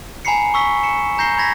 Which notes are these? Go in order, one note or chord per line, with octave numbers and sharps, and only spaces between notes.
G#5 A#5 B5 C7 C#7
C#6 E6 B6 G7
C#7 E7
A#5 G6 A#6 C7 G7
B5 G#6 A#6 B6